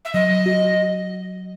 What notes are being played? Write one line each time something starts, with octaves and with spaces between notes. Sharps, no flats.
E5
F#3 D#5
F#4